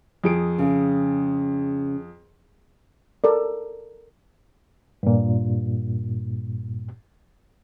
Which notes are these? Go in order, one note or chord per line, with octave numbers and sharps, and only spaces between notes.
F2 G#4 D7
C#3
A4 A#4 D5
G2 A#2